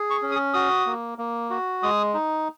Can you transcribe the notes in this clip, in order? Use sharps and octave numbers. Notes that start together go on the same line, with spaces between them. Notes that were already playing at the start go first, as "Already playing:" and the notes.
Already playing: G#4
C#6
C#4
D#6
F#4 D#6
A#3
A#3
F#4
G#3 D#6
D#4